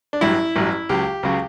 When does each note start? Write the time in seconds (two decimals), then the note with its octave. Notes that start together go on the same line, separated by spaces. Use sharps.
0.13 D4
0.21 A1 G2 F#3 E4
0.56 A1 G2 F#3
0.89 C#2 C#3 F#3 G4
1.23 C#2 C#3 F#3